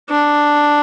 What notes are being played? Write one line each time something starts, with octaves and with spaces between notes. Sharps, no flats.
D4